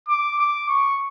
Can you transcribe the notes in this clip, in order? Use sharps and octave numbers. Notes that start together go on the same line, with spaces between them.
D6
D6
C#6